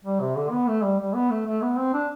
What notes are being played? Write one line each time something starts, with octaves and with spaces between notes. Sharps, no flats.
G3
C3
D3
B3
A3
G3
G3
B3
A3
A3
B3
C4
D4